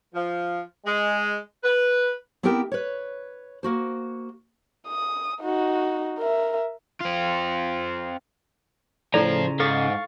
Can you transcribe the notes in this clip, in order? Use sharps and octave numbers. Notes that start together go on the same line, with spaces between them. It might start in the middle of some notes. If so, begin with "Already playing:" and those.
F3
G#3
B4
B3 C4 E4 G4 A#4 G5
B4 C#5
A#3 F#4 C5
D#6
D#4 F#4
A#4 E5
C4 F4
A2 C#3 F3 E4 A4 C5 D5 A#5
G#2 A4 F5 C#6 A6